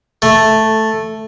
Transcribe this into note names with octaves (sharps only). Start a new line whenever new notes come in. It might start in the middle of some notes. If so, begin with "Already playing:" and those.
A3